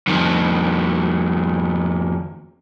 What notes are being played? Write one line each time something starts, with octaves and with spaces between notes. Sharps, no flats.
F2 D#3